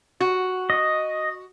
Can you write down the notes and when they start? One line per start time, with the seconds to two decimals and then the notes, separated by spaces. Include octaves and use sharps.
0.20 F#4
0.70 D#5